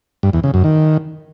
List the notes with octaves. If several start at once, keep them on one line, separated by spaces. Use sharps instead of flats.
G2
E2
C#3
F#2
D#3